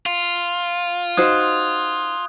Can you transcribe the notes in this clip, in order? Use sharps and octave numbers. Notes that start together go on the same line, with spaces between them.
F4
D#4 F#4 C5 D#6 F#6 G#6